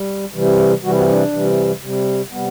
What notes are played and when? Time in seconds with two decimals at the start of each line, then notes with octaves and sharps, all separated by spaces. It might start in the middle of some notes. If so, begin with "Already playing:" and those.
Already playing: G3
0.34 C3 E3 G3
0.83 C3 E3 G3 F#4
0.91 E4
0.98 F#4
1.09 D4
1.32 C3 E3 G3
1.82 C3 G3
2.31 C3 G3 B3